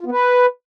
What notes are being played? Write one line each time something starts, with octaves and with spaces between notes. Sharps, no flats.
F4
B3
B4